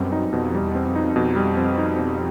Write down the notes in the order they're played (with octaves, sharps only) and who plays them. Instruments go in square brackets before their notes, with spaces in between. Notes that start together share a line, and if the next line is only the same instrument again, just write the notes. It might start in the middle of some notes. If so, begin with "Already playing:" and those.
Already playing: [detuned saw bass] F#2 [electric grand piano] B2 G3 C4
[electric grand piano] D#4
[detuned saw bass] F2 [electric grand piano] B2
[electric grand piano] G3
[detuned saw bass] E2
[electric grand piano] C4
[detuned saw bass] F2
[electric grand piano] D#4
[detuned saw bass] F2 [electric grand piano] B2
[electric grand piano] G3
C4
D#4
B2